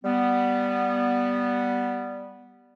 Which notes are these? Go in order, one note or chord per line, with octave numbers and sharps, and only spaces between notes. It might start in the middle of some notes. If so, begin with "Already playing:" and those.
G3 B3